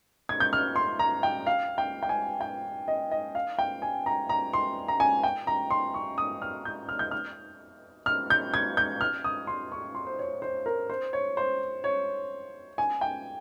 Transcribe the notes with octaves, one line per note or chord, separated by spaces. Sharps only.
G#6
G6
F6
C6
A#5
G5
F5
G5
G5
G#5
G5
D#5
D#5
F5
G5
G#5
A#5
A#5
C6
A#5
G#5
G5
A#5
C6
C#6
D#6
F6
G6
F6
G6
F6
F6
G6
G#6
G6
F6
D#6
C6
C#6
C6
C5
C#5
C5
A#4
C5
C#5
C5
C#5
G#5
G5